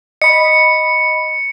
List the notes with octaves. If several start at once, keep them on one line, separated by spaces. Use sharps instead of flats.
D#5 B5 C#7